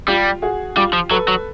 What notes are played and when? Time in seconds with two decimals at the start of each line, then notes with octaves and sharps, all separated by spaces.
0.08 G3 F4 G4
0.42 F#4 G#4
0.76 G3 F4 G4
0.93 F3
1.11 F#3 A4 B4
1.28 F#3